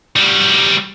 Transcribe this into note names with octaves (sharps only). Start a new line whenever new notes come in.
G3 F#4